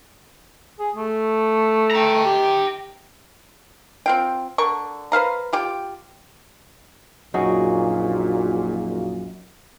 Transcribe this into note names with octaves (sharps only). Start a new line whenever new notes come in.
G#4
A3
G5 A#5
G4
C4 F4 G5
D3 A#4 C#6
B4 C5 F5 A#5
F4 G4 G5
A#1 F#2 A#2 D#4 F#4 G#4